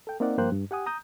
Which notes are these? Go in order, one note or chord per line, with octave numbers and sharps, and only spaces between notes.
A4 G5
A#3 C4 D#4 A#4 D5 F#5
G2 F3 A#3 C5 G5 F#6
G2
G4 F#5 G#5 D#6
A#5 D#6 G6